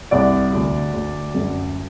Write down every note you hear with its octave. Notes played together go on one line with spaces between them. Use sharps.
C2 D5 F#5
D2
D2
F#2